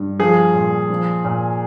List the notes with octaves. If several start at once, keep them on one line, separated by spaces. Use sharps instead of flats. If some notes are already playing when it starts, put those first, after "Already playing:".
Already playing: G2
F3 G#4
A#2
F3
A#2